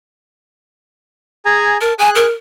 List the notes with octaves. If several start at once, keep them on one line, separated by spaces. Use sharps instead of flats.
G#4 G#5 A#5
A#4 A5
G#4 G#5 F#6
A#4